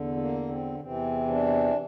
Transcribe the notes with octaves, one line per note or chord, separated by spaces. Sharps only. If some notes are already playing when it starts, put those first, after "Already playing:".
Already playing: E2 D3
A#3
C4
D4
E2 C3 E3 C4
D4